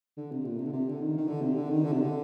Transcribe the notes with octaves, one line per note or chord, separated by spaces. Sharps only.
D3
C3
A#2
C3
D3
C3
D3
D#3
D#3
D3
C3
D3
D#3
D3
C3
D3